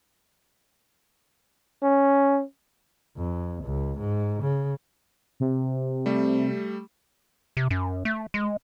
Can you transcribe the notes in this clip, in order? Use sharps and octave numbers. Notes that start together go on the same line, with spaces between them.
C#4
F2
C#2
G#2
C#3
C3
G3 A3
C3
F#2
A3
G#3